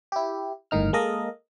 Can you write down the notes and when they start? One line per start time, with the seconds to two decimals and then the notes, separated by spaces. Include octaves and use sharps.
0.12 E4 G4
0.71 G1 A2 D#3 D#4 F6
0.93 G#3 A#3 A4 A#4 D#5